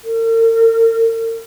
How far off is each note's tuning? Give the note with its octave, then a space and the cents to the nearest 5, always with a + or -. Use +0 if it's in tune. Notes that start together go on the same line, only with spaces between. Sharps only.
A#4 -45